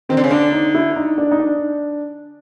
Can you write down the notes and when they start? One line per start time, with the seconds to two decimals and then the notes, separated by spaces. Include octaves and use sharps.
0.09 D#3 C4
0.17 D3
0.24 C#3
0.30 D3 D4
0.52 D#4
0.74 E4
0.96 D#4
1.18 D4
1.31 D#4
1.39 D4